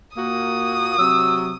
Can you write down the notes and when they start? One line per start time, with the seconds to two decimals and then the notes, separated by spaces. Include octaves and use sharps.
0.16 A#2 A#3 F#4 D#6
0.98 C3 F#3 E6